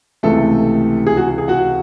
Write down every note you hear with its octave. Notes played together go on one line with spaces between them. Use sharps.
C#2 C3 E3 A3 A4
G#4
F#4
G#4
F#4 F#5